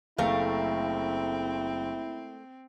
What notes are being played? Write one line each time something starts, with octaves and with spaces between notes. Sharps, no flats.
F#1 A3 C4 E4 A#4 F5